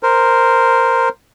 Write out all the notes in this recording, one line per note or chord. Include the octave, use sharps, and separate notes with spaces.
A#4 C5